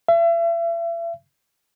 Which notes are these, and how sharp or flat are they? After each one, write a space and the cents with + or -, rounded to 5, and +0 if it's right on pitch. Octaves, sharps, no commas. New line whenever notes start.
E5 +40